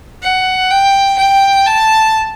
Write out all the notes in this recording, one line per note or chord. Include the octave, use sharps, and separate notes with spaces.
F#5
G5
G5
A5